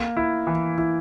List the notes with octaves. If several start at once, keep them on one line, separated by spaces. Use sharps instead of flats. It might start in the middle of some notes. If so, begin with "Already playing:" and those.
Already playing: A#3
E4
E3
E4